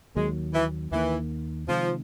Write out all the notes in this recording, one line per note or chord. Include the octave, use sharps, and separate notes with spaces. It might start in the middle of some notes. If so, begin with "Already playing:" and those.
D#2 D#3 F#3 G#3 A#3
E3
D#2 D#3 E3 F#3 A#3
C3 D#3 F3 G#3